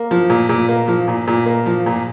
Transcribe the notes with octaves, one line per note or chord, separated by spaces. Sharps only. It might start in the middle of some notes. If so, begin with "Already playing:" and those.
Already playing: A#3
F3
A#2
A#2
A#3
F3
A#2
A#2
A#3
F3
A#2